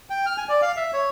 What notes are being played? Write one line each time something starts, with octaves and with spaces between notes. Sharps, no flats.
G5
F6
G#5
D5
F5
E5
C#5